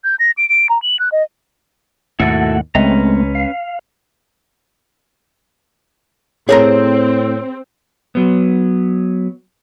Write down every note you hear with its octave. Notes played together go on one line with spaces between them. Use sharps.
G6
A#6
D7
D7
A#5
F#7
F#6
D#5
D#2 G#2 B2 A3 E4 F#4 A4 F#5
C#2 G#3 A3 C4 C#4 B4 A#5
F5
A2 C4 G#4 A#4 C#5 A#5
F#3 B3